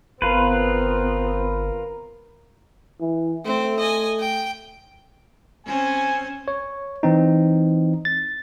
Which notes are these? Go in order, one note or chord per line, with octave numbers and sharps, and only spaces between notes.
G1 B3 C4 F4 A#4 B4
E3
A3 C4
D#5 G#5
G5
C4 C#4 C5 G#5
C#5
E3 C4 D#4
A6